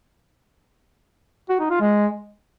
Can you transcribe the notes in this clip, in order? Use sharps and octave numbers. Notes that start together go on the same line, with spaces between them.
F#4
D#4
F4
G#3